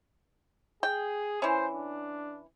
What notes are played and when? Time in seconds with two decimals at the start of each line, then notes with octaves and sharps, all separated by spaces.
0.83 G#4 G5
1.42 E3 C#4 C5
1.71 D4